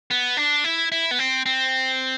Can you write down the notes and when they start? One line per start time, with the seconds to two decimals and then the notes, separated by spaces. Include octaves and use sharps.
0.11 B3
0.37 D4
0.64 E4
0.92 E4
1.11 B3
1.19 C4
1.46 C4